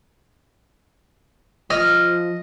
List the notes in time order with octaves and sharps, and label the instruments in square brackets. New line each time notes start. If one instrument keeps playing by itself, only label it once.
[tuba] F3 [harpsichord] D#5 [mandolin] F6